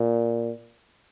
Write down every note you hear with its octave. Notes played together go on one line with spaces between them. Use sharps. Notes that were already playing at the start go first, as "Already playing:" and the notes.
Already playing: A#2